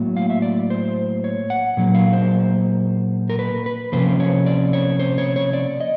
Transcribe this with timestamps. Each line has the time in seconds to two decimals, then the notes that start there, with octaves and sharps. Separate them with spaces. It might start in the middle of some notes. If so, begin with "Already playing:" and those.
Already playing: A2 F#3 A#3
0.17 F5
0.30 E5
0.42 D5
0.70 C5
1.24 C#5
1.50 F#5
1.77 A#2 F#3 A#3
1.95 F5
2.13 C5
3.30 A#4
3.39 B4
3.66 B4
3.92 C3 F3 A#3 C#4 C5
4.20 C#5
4.46 D5
4.73 C#5
5.00 C5
5.18 C#5
5.36 C#5
5.53 D5
5.80 D#5